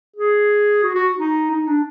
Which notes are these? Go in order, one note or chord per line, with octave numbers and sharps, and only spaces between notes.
G#4
F#4
F#4
D#4
D#4
D4